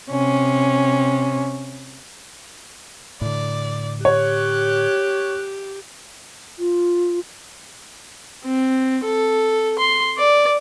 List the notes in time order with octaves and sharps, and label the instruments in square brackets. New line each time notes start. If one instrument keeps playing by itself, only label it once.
[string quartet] C3 C#4
[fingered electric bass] A2 D3 [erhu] D5
[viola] G4 [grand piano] C#5 [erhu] F#6
[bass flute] F4
[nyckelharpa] C4
A4
C6
D5